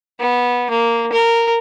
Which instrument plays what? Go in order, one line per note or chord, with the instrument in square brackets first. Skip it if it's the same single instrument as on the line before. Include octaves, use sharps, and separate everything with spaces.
[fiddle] B3
A#3
A#4